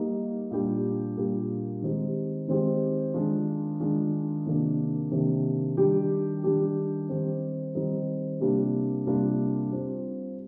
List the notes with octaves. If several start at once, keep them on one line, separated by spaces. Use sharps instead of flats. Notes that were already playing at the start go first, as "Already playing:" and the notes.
Already playing: G3 A#3 D#4 G4
A#2 G3 A#3 D4 G4
A#2 G3 A#3 D4 G4
D#3 G#3 C4 D#4 G4
D#3 G#3 C4 D#4 G4
D#3 G#3 D4 F4
D#3 G#3 D4 F4
C3 D#3 A#3 D4
C3 D#3 A#3 D4
D#3 G3 D4 G4
D#3 G3 D4 G4
D#3 G3 C4 D#4
D#3 G3 C4 D#4
C3 G3 A#3 D4 F4
C3 G3 A#3 D4 F4
G3 C4 F4